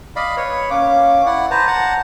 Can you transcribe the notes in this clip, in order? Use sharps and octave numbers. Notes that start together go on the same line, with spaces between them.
D5 D#5 F5 B5
B4 C#5
A#3 C#4 D6
E4 D5 F#5
B4 C5 A5 A#5
F#5 A5 A#5